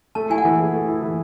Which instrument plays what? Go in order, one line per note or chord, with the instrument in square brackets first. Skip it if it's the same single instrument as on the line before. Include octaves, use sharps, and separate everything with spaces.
[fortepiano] A3 [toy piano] A5
[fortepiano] E4 [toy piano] G#5
[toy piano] F#5
[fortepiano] E3
G#4
A3
E4
E3